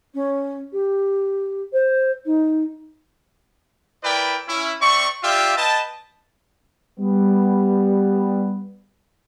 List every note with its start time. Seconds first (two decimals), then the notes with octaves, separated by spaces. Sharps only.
0.14 C#4
0.72 G4
1.72 C5
2.25 D#4
4.03 E4 A#4 B4 D5 E5 G5
4.47 C#4 E4
4.81 C4 D5 E5 C#6
5.23 F4 G4 D5 E5 F5 G5
5.56 B4 D#5 G5 A5
6.99 G3 B3